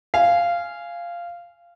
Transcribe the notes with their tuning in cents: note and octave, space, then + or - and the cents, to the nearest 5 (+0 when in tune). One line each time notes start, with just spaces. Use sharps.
F5 -10 G#5 +0